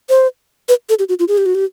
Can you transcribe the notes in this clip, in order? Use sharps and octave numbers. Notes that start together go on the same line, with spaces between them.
C5
B4
A4
G4
F#4
F4
G#4
G4
F#4
G4